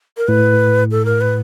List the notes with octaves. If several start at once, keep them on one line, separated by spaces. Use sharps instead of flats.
A#4
A2 B4
A4
A#4
B4